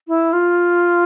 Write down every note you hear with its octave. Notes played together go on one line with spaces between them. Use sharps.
E4
F4